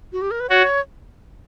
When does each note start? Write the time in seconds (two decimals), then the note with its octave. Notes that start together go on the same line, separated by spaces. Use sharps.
0.13 F#4
0.22 G4
0.31 A#4
0.40 B4
0.49 F#4 C#5